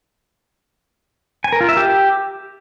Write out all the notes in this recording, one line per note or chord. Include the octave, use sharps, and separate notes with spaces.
G#5
A#4
F4
E5
G4